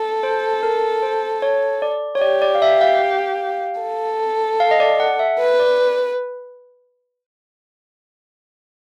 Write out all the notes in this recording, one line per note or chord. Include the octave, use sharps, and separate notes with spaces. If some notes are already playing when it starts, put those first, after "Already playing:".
Already playing: A4
C5
A#4
C5
C#5
D5
C#5
G4 D5
D5
F5
E5
F5
A4
F5
D#5
D5
F#5
E5
B4
D5